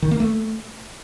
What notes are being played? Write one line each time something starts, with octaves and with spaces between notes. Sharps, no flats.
D#3
A#3
A3